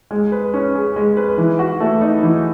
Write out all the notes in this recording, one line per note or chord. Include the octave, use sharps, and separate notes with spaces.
G#3
B4
C#4
G#4
G#3
B4
E3
F#4
A3
D#4
E3